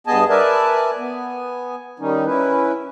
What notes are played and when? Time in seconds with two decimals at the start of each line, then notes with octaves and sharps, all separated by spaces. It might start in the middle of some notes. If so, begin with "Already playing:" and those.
0.07 G2 B3 G#4 D#5 G#5 A5
0.30 A#4 B4 D5 E5 G#5 A5
0.98 B3 G#5
2.00 D#3 G3 C#4 D#4
2.26 C#4 E4 B4